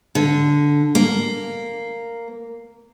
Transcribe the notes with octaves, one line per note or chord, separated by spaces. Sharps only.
D3
A#3